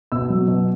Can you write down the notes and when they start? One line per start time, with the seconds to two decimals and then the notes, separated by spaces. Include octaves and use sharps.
0.12 B2 E6
0.30 F#3
0.48 B2